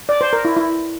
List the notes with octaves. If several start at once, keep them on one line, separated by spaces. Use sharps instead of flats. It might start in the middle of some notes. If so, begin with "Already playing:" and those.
D5
C5
A#4
E4
E4